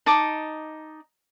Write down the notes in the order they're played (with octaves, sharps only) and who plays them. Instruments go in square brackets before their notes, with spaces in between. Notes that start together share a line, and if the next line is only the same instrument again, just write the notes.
[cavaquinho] D#4 A5 D6